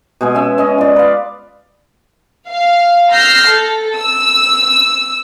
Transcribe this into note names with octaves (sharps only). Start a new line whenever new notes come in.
B2 G#3 G#5
C#4 E5
C#4 D#5
F4 D5
B4 F5
F5
E6 F6 G6 A#6 C7
A4
E6